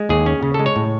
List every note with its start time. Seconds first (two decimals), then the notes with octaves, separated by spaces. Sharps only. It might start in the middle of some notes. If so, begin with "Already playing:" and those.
Already playing: G#3
0.09 D#2 G#4
0.26 C#4
0.43 C#3
0.54 A4
0.59 G#3
0.66 C#5
0.76 A2